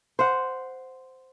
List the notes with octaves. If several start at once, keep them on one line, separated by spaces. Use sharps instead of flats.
C5 F#5